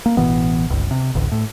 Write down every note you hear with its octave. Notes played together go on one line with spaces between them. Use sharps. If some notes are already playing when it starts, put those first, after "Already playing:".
A#3
A1 B2 E3 B3
G1 C#2
C3
A1 D2
A2